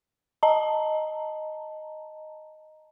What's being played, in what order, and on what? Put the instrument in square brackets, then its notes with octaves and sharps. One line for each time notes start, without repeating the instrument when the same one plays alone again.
[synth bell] D#5 A5 A#5